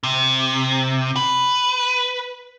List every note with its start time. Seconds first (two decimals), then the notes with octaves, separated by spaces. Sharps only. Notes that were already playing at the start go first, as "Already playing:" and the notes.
0.03 C3
1.16 B4